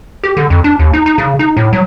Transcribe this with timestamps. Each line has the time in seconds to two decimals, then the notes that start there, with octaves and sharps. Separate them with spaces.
0.23 G4
0.37 D3
0.50 F2
0.64 D4
0.79 D#2
0.93 D#4
1.06 D#4
1.18 C#3
1.39 D#4
1.57 A2
1.73 F#3